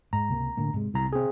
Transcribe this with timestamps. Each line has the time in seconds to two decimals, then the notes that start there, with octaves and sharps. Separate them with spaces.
0.13 G#2 A#5
0.29 C#2 C3 A#3
0.57 A2 D3 A#3
0.73 G#2 C3 G#3
0.94 C2 C3 A#5
1.13 C4 G#4